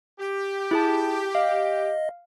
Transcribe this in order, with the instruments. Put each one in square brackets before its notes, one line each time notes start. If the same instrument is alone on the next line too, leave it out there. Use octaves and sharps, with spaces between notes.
[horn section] G4
[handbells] E4 G#4 A5
[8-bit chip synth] D#5 [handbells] F5